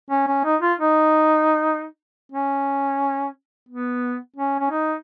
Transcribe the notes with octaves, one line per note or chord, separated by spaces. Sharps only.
C#4
C#4
D#4
F4
D#4
C#4
B3
C#4
C#4
D#4